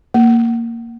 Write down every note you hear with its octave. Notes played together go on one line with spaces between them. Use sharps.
A#3